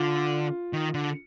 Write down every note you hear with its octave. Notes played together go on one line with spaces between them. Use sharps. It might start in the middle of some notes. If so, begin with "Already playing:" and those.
Already playing: D3 F4
D#3
D3